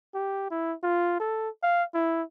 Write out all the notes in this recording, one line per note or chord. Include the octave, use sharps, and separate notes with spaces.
G4
E4
F4
A4
F5
E4